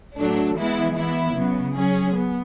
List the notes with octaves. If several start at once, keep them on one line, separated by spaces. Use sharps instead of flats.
A2 F#3 A3 D4
E3 G#3 B3 E4
E3 B3 E4
C#3 F#3 B3
F#3 C#4 G#4
B3